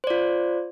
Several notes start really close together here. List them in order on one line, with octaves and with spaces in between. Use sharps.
C5 D5 F4